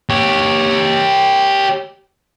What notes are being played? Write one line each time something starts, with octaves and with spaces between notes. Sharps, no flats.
G4 C#5